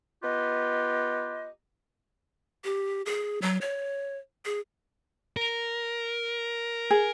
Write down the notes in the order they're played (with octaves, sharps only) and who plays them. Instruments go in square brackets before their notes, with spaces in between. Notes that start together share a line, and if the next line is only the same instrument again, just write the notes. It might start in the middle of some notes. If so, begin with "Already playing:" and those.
[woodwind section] B3 F4 G4 B4 D#5
[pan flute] G4
G#4
F#3
C#5
G#4
[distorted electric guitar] A#4
[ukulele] G#4